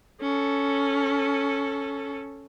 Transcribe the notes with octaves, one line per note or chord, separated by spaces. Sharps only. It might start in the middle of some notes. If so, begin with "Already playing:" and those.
C#4 A4